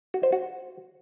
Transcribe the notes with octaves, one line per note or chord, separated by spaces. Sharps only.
F#4
C5
F#4